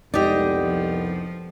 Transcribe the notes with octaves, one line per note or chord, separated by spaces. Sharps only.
C2 F2 G#3 B3 D#4 G4 D5 D#5
F3